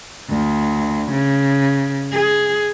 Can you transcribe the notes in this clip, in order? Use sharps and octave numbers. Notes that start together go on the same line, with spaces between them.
D2
C#3
G#4